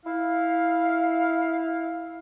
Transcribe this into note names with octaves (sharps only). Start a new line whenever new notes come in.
E4 F5